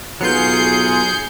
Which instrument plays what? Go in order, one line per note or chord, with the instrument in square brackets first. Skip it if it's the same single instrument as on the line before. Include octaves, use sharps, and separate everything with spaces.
[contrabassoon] B1 [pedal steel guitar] F#3 B3 F4 [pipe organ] G#4 [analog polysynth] G6 C7 C#7